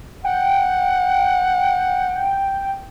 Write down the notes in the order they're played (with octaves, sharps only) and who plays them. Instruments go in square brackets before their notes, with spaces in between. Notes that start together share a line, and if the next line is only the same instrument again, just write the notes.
[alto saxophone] F#5 [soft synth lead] G5